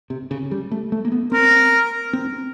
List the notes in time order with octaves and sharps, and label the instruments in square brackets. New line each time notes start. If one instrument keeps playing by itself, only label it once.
[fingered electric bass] C3
C#3
G3
A3
A3
A#3
B3
[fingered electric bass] C4 [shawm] A#4
[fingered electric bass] C4